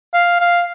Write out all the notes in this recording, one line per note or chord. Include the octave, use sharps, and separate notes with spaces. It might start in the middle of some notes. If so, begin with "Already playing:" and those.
F5
F5